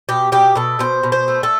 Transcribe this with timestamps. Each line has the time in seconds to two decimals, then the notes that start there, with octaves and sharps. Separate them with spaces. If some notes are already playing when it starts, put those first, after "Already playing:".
0.09 B2 G4
0.32 B2 G4
0.55 B2 A4
0.79 B2 C5
1.03 B2
1.12 C5
1.28 A3
1.43 A4